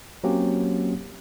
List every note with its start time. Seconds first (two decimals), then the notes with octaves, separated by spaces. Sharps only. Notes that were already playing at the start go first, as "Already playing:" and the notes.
0.24 F#3 A#3 C4 C#4 G4